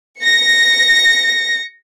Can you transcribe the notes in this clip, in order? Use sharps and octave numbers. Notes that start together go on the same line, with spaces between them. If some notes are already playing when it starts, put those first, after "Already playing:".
A#6 C#7